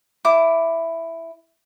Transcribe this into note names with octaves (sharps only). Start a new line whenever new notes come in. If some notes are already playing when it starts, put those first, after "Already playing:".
E4 D6